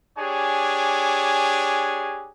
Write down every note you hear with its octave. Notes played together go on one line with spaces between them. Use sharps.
D4 G4 G#4 C#5 G#5